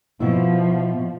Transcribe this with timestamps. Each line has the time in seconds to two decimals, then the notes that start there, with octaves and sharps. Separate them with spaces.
0.20 B2 F3 E4